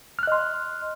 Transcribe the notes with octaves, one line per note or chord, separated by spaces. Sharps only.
D#5 C6 F6 F#6